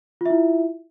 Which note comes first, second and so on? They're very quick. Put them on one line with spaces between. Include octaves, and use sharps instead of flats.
F4 E5 E4